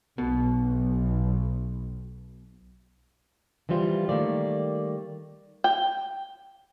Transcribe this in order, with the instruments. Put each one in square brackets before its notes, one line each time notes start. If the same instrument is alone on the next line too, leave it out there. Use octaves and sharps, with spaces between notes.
[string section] B1 [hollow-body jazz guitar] B2
[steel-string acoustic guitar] E3 F3 G3 F4
D#3 F3 G3 A3 A#3 D5
[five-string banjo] G5